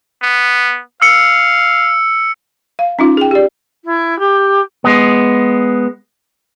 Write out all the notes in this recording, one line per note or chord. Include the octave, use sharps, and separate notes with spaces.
B3
F5 E6 C#7
F5
C#4 D#4 F4
G#4 G5
G4 D5
E4
G4
G#3 B3